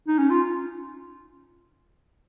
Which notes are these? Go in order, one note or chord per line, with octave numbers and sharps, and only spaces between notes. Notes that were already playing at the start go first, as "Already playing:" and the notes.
D#4
C#4
F4